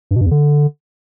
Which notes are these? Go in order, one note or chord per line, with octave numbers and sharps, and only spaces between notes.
G2
B2
G2
E2
D3